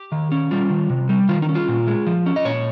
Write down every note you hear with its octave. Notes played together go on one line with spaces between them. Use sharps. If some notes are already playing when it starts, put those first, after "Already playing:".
Already playing: G4
D#3
C#4
G3 F4
D#3
C3
G3
D#3 F4
D#4
C#4
F4
A#2
G#3
F3
C#4
D#5
A#2 C#5